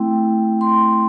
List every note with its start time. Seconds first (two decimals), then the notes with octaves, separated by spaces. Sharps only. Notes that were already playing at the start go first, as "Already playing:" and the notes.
Already playing: A3 C4 E4 G5
0.61 C6